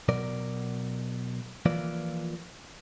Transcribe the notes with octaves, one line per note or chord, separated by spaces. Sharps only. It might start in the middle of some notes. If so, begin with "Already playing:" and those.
B2 F#3 A#4 D5
E3 F3 A#3 F4 B4 D5